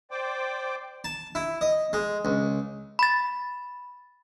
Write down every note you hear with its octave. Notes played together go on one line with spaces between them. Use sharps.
C5 D5 G5 D6
A5
E4
D#5
G#3
C#2
B5 A6